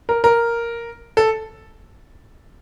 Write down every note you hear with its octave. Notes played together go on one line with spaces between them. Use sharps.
A#4
A#4
A4